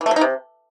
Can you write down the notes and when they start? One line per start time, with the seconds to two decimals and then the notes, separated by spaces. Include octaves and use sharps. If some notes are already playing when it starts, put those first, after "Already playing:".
0.01 E3
0.06 A3
0.11 F#3
0.16 D#4
0.21 C3